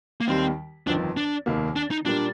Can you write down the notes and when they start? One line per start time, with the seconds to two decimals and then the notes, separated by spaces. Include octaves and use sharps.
0.21 A#3
0.27 D#2 D#3 G3 C4
0.87 G1 F2 D#3 D4
1.17 D4
1.46 F1 D#2 D#3 A#3
1.76 D4
1.91 D#4
2.05 A#2 G3 A#3 D4